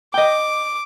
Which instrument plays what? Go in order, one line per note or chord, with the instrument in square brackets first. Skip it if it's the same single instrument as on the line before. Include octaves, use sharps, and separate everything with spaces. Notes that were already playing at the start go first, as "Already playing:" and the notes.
[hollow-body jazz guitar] D#5 G5 [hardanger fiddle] D6